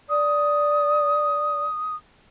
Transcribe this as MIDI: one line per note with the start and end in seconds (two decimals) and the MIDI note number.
0.09 1.65 74
0.09 1.95 87